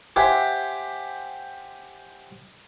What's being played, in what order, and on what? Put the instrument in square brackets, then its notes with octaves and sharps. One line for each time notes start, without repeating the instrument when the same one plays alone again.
[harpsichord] G4 C5 E5 F#5 G#5